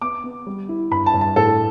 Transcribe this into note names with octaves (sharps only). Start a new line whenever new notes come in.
B3 D6
B3
G3
E4
G2 B5
A5
G2
A5
A2 A4